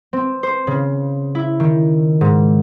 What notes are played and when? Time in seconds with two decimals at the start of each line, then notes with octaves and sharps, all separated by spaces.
0.13 C4
0.43 C5
0.67 C#3
1.35 E4
1.60 D#3
2.21 G#2